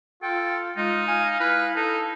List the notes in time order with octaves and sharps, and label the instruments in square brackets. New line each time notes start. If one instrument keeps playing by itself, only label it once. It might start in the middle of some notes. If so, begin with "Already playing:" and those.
[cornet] F4 [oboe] A4 [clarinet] G5
[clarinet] G#3 [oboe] D#4 [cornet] F4
[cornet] F5 [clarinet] G#5
[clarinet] E4 [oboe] B4
[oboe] D#4 [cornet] A4